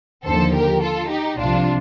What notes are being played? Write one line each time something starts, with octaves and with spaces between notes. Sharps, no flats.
D#2 D3 F3 A4 C5
G4 A#4
F4 A4
D#4 G4
C2 C3 F3 D4 F4